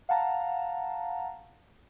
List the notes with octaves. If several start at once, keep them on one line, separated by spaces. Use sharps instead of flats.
F5 F#5 A5 A#5